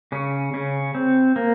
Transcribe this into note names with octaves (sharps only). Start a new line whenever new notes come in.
C#3 C#4
C#3 C#4
C4
A#3